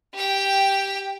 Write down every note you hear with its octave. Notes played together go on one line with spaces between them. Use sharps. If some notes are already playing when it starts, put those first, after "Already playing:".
G4 G5